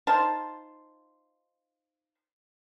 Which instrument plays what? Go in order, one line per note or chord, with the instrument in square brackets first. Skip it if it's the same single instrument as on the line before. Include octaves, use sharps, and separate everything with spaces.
[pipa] D#4 F4 C5 A5